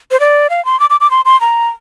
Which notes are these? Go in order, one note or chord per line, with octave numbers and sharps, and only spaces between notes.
C5
D5
F5
C6
D6
D6
D6
C6
C6
A#5